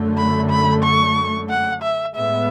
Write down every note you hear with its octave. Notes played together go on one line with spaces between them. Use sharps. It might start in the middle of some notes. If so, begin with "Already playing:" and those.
Already playing: F#2 D3 A3
B5
B5
C#6
F#5
E5
A2 G#3 B3 E5